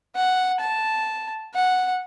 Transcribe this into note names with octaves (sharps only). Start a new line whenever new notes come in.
F#5
A5
F#5